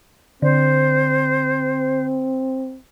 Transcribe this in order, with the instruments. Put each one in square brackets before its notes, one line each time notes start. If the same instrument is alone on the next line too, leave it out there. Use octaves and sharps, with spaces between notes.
[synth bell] D3 [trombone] C4 [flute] C5